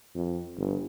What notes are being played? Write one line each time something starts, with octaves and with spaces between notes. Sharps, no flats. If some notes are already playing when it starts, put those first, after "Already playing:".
F2
G1